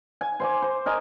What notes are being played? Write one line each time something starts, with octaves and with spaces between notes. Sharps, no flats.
G#5
C5 G#5 D6
C5
A#4 D#5 G#5